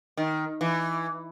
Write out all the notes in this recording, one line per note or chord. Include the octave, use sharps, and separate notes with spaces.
D#3
E3